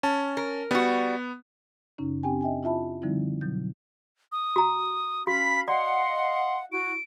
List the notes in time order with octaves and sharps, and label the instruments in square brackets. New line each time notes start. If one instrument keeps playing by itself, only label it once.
[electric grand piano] C#4 A5
[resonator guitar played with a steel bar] A#4
[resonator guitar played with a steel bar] G3 F#4 [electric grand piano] B3
[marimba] F#2 C#3 C#4 D#4
C4 D4 G4 G5 G#5
D#5 E5 G5 G#5
E4 F4 E5 A5 B5
D3 F3 G3 C4 D#4 E4
B2 F#3 G6
[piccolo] D#6
[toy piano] F#4 A#5
[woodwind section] C#4 F5 B5 [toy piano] F#4 [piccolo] B6
[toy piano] D5 [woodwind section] D#5 F5 F#5 [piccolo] C6
[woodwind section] E4 F#4 [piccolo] D7